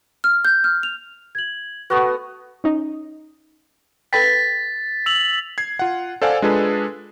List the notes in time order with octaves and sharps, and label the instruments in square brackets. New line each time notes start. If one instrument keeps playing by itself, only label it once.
[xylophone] F6
G6
F6
F7
[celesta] G#6 F#7
[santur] A3 B3 F#4 [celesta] B4 C#6 D#6
[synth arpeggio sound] C#4 D#4 D#5
[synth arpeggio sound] A4 B4 G5 [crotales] A6 B6
[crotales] E6 F7 F#7
[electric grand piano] G#6 C7
F4 F#5
A4 C5 D5 F5 F#5 G#5
G#3 D4 F4 G#4 A4 B4